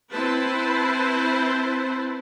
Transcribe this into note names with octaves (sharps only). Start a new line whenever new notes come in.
C4 E4 B4 C5 A5